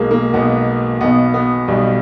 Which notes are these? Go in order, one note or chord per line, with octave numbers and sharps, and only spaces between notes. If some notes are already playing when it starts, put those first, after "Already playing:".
Already playing: B1 B2 G#3 A#3
A#3
B1 B2 B3
B1 B2 B3
B3
B1 B2 G3